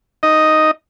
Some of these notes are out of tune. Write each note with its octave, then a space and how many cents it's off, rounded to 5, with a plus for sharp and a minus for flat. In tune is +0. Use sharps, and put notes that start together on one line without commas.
D#4 +0 D#5 +0